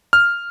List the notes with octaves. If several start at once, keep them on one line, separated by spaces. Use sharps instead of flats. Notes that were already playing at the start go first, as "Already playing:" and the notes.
F6